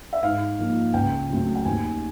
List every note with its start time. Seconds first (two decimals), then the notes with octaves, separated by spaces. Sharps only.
0.13 E5
0.22 G#2 F5
0.58 F3 A#3
0.93 C#2 G5
1.30 C#3 F#3 A3 C4
1.55 G5
1.65 D#2 G#5